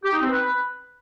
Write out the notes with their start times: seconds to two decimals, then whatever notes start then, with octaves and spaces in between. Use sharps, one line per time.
0.04 G4
0.12 D#4
0.21 C4
0.29 B4